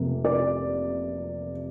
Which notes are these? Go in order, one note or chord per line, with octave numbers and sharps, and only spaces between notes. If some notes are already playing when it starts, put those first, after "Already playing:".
Already playing: F1 F2 C3 A#3
D5